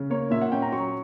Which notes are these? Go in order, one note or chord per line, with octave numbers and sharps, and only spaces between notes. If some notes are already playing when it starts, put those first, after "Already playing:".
Already playing: C#3
A#3 C#5
A#2 E5
F#5
C#4 G5
A#5
F#3 C#6